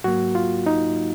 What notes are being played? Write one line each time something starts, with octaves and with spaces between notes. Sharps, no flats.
G#2 F#3 A#3 F#4
F4
D#4